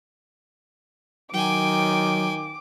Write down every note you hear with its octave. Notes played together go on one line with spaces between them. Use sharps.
D#3 F#3 G5 G#5 D6